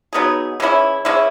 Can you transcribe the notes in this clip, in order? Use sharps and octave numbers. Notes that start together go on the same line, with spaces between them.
F#3 B3 D#4 G#4
E3 G#3 C#4 E4
E3 G#3 C#4 E4